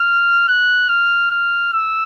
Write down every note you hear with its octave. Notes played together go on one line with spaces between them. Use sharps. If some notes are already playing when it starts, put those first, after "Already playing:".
Already playing: F6
F#6
F6
F6
E6